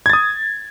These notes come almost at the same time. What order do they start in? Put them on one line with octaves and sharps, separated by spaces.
G#6 A6 D#6